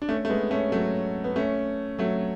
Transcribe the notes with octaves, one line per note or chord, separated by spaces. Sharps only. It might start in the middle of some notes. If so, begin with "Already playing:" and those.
D4
A3 C#4
A3
G#3 B3
A3 C#4
F#3 A3
B3
A3 C#4
F#3 A3